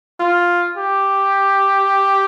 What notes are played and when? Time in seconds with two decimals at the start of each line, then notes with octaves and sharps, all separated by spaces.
0.20 F4
0.78 G4